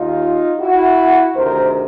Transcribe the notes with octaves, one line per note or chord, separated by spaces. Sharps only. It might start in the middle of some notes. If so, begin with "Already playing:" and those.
Already playing: D#2 D#3 D#4 F4
E4 F#4
D2 C3 D#3 A#4 C5